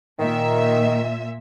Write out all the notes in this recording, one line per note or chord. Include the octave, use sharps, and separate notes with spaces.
A#2 D#3 E5